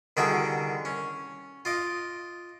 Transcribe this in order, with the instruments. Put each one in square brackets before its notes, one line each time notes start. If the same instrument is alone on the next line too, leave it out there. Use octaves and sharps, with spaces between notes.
[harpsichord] C2 D3 D#3 F#4 G#4 G5
C#4
F4 D#5 D6